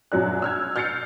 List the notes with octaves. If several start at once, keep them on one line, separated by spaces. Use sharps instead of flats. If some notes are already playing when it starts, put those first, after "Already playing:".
A#1 F#2 F#3 D4 F#6
E6 F6 G#6
F6 G6 A6 C7 C#7